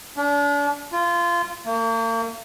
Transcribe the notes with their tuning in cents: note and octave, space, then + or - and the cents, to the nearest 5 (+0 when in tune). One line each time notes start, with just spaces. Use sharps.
D4 -35
F4 -20
A#3 -40